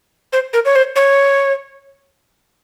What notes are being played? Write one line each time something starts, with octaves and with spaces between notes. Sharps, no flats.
C5
A#4
C#5
C5
C#5